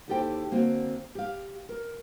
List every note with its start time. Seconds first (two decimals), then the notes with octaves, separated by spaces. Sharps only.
0.08 D#2 E4 G4 A4 C5 G5
0.51 D3 A#3 C4 F#4
1.15 G4 F5
1.69 A#4